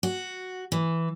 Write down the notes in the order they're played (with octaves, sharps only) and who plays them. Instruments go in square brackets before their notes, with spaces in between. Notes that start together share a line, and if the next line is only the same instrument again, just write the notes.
[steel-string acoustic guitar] F#4
E3